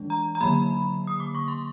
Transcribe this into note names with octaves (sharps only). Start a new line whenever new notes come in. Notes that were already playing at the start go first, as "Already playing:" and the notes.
Already playing: E3 G#3 D4
A#5
A#5
D3 F#3 A#3 B5
D#6
D6
C#6
C6